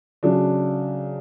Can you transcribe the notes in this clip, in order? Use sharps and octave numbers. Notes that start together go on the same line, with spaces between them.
C#3 F#3 A3 D4